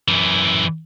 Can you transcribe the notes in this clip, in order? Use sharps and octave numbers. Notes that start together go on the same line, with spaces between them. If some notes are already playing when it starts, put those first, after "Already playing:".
F#2 E3